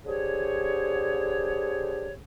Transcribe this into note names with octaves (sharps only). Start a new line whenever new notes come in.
D3 G4 G#4 C5 C#5